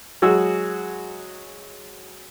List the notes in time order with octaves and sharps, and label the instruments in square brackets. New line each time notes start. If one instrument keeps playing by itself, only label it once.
[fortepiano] F#3 G#3 F#4 G#4 E6